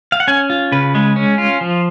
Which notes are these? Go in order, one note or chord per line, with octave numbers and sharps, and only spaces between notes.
F5
F#5
C#4 G#5
F4
C#3 B4
G#3
C#4
F4
F3